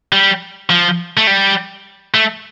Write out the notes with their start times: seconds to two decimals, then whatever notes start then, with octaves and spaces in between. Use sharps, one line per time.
0.13 G3
0.70 F3
1.17 A3
1.27 G3
2.14 A3